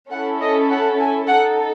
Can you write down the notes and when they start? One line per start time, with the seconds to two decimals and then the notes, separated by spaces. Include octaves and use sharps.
0.12 C#4 E4 A4 F#5
0.41 D#5
0.70 F#5
0.99 G#5
1.28 D#4 A4 F#5